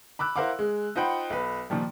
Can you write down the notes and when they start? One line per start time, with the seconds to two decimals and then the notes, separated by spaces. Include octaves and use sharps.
0.19 B5 D6 E6 F#6
0.36 E4 A#4 C5 F5 F#5 D6
0.59 G#3
0.96 D#4 F4 C5 F#5 G5 B5
1.30 B1 B4
1.70 A#2 D#3 F3 G3